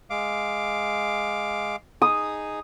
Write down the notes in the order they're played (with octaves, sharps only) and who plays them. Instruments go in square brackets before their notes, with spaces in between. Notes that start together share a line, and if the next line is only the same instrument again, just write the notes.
[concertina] G#3 F5 D6
[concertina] D#4 G#4 [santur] D#6